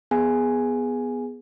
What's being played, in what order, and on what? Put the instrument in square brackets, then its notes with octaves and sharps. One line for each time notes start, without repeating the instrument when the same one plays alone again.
[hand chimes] B3 G#4 G#5